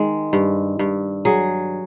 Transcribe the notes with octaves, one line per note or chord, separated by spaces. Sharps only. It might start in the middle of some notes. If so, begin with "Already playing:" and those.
Already playing: D#3 G#3
G2
G2
F#3 G#4